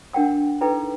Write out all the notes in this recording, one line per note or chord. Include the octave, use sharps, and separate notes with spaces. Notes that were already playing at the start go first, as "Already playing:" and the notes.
D4 A#4 F#5 G5 E6
D#4 E4 A4 B4 G5